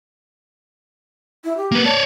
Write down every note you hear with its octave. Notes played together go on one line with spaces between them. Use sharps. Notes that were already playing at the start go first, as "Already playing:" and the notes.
E4
G4
A#3 B4
C#5 D5 A5